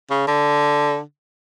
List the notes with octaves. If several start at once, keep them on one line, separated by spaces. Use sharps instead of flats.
C#3
D3